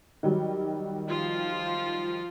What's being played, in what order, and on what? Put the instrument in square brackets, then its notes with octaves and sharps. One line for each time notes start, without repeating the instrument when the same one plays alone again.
[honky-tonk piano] D#3 F#3 G3
[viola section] F3 F4